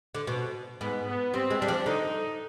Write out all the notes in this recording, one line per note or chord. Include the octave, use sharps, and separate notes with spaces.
D3
B2
G#2 B3
B3
G3 C4
G#3
G3 D4
F3
D3 D#4